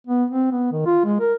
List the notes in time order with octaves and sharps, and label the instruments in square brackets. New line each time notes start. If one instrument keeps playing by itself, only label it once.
[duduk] B3
C4
B3
D#3
F4
G#3
A#4